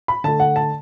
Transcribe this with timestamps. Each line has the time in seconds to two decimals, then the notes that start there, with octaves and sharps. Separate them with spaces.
0.08 B5
0.24 D3 A3 A5
0.40 F#5
0.56 A5